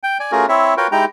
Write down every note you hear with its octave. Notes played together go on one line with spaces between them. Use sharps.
G5
D5 G#5
A3 C#4 F4 F#4 G#4 A#4
C4 E4 C#5 E5
F4 F#4 A#4 B4 C#5 G5
G#3 D#4 E4 G4 G5 A#5